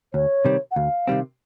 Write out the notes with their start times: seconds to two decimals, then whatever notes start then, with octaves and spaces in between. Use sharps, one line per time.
0.13 D2 C#5
0.45 C3 D#3 G3 C4
0.71 F#5
0.76 D2 F5
1.07 C3 D#3 G3 C4